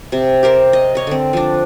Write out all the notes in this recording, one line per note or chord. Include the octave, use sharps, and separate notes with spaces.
C3
G4 A#4 C5
D#5
C#5 D#5
D3 C4
F3 D4